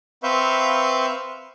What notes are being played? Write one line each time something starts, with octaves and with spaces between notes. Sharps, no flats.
C4 B4 E5 F5 C#6 G6